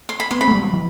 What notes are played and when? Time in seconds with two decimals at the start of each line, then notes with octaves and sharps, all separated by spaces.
0.09 C6
0.20 B5
0.31 B3 C6
0.41 C4 B5
0.48 A3
0.51 G3
0.62 F#3
0.74 E3